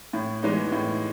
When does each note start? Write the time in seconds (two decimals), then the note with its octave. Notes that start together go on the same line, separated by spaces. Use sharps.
0.13 A2
0.43 E3 G#3 B3 D#4
0.72 A2